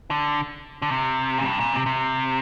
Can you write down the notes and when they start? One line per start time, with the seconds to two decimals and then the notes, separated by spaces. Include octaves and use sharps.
0.11 D3
0.82 D3
0.91 C3
1.38 A#2
1.45 G2
1.60 A#2
1.73 C3
1.86 C3